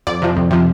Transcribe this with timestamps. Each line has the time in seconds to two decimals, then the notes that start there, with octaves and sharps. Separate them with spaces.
0.07 F2 D5
0.22 C3 F3
0.37 F2
0.51 C3 F3